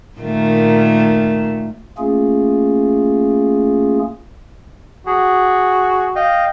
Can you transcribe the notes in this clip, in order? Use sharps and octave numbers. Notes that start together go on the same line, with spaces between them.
A#2 D#3 A3
A3 A#3 C#4 F4 G#4
F#4 G#4
D#5 F5 G5